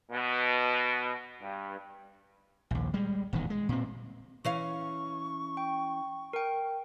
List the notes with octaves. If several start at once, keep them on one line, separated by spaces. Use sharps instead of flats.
B2
G2
A#1 D#2
G3 G#3
D#1 E2 A2 D#3
G#3
A#2 C4
E3 C#4 F5 C#6
G5
A#4 G5